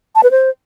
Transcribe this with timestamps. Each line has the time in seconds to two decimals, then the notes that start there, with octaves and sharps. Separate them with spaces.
0.15 A5
0.23 B4
0.31 C5